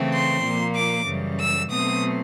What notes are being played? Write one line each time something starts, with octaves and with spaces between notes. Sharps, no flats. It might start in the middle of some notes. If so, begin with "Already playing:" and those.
Already playing: C#3 E3 A3 C4
C6
A#2 F3 A#3
D6
F#2 C#3 E3 G3
E6
B2 F#3 A3 C4 D#6